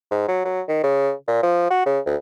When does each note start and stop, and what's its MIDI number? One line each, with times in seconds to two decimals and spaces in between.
0.11 0.26 44
0.28 0.43 54
0.45 0.61 54
0.68 0.82 51
0.84 1.12 49
1.28 1.38 46
1.43 1.70 53
1.71 1.84 66
1.86 2.00 49
2.06 2.16 38